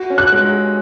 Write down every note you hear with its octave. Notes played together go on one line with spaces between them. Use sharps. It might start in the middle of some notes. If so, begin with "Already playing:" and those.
Already playing: F#4
C#4
F#6
G#3